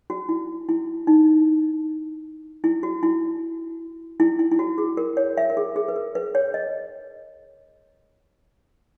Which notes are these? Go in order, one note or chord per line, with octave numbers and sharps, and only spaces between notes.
F#4
E4
E4
D#4
E4
F#4
E4
E4
E4
E4
F#4
G#4
A#4
C#5
E5
A#4
G#4
G#4
B4
A#4
B4
C#5
D#5